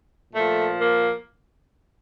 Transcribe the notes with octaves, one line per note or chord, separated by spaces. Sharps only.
A#2 F3 A3
A#3